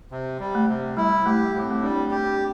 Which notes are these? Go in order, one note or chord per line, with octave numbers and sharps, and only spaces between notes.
C3
G3
A3
C3
G3 E4
A3 G4
A2 A3
C4
A3
G3 D4
G4
D4